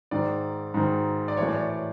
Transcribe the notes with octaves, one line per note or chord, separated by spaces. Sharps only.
G#2 D#3 D5
G#2 D#3
D5
A2 E3 C#5
D5
C#5
D5